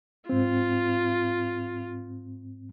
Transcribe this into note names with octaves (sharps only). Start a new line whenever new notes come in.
G#2 C4 F4